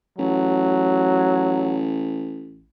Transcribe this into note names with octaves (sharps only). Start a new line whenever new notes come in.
A1 F#3